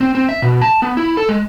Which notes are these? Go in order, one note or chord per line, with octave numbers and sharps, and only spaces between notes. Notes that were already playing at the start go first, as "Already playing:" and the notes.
C4
C4
E5
B2
A5
B3
E4
A4
G#3